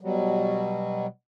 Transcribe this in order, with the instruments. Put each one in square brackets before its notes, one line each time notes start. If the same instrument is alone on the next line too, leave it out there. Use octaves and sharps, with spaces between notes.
[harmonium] B2 F#3 G3